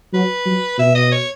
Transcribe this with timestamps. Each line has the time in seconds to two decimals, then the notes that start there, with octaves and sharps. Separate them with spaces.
0.13 F#3 B4
0.46 F#3
0.78 B2 E5
0.95 D#5
1.12 C#5